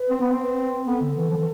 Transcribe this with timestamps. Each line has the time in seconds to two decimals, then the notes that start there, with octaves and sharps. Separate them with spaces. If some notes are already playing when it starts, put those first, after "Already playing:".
Already playing: B4
0.10 C4
0.21 B3
0.31 C4
0.43 B4
0.87 B3 A4
1.01 D3
1.16 E3
1.30 F3
1.38 E3